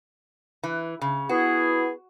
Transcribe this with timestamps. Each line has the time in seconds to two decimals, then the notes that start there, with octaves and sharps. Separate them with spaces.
0.63 E3
1.02 C#3
1.29 B3 E4 F#4 G#4